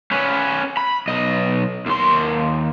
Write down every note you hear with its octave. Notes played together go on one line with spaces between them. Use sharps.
C#4 B4
B5
B1 D#5
D#2 C6